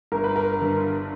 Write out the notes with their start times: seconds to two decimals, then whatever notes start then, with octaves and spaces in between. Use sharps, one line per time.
0.12 G1 A#4
0.24 B4
0.36 A#4
0.59 G2 D3